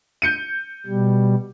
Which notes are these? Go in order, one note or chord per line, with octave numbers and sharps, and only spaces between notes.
G6 C#7 D#7
B2 G3